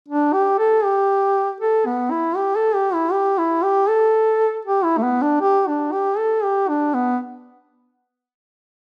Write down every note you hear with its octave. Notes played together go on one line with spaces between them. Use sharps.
D4
G4
A4
G4
A4
B3
E4
G4
A4
G4
E4
G4
E4
G4
A4
G4
E4
A3
B3
D4
G4
D4
G4
A4
G4
D4
B3